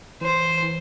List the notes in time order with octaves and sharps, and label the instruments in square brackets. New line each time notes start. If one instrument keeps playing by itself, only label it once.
[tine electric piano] E3 [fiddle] C5
[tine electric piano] E3